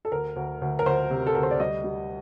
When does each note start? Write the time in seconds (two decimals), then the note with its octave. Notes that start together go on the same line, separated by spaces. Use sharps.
0.05 A4
0.12 D2 A#4
0.36 D2
0.62 D2
0.79 A#4
0.86 D2 C5
1.10 C3
1.27 A4
1.35 D2 A#4
1.43 C5
1.51 D5
1.60 G3 D#5
1.84 G3